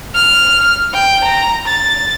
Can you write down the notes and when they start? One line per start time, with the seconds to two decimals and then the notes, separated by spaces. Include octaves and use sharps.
0.14 F6
0.93 G5
1.24 A#5
1.67 A6